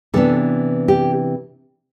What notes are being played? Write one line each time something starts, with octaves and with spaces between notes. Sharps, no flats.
C3 E3 B3 D4 A4
G4